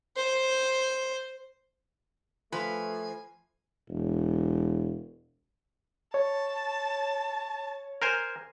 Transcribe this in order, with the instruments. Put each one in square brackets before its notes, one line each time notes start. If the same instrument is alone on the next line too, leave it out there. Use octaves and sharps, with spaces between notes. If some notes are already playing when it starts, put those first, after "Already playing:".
[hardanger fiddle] C5
[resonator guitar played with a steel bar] F3 [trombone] A3 [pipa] B4 [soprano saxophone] G#5
[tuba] E1
[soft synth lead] C#5 [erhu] A5
[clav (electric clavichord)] A#4 C5 G#5